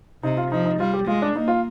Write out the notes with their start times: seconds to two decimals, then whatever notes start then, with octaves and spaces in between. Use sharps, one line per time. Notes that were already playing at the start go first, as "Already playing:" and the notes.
0.23 C3 D#4
0.37 F4
0.51 F3 D#4
0.66 D#4
0.80 G3 F4
0.94 G4
1.07 G#3 F4
1.22 D4
1.36 A#3 D#4
1.48 F4